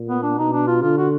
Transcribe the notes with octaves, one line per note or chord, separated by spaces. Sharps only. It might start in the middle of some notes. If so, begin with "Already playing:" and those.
Already playing: A#2
B3
D4
B2 D#4
D4
F4
D3 F4
F#4